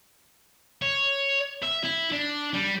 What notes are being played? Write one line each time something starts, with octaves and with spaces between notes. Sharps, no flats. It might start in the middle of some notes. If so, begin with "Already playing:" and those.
C#5
E5
E4
D4
G3